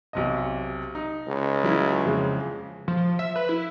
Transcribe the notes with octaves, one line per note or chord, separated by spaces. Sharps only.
B1 C3 D#5
D#4
C#2
F#3 E4
F2 C#3 G#3
F3
E5
B4
E4